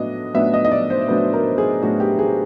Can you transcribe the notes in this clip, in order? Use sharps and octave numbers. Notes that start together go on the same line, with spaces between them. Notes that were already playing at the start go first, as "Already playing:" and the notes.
Already playing: A2 F#3 B3 D4 D#5
A2 F#3 B3 D4 E5
D#5
D#5
D5
C5
A2 F#3 B3 D4 B4
A#4
G#4
A2 F#3 B3 D4 F#4
G4
G#4